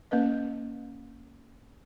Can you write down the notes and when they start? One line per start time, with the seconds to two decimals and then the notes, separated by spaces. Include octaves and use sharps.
0.11 A#3 C#4 B4 D#5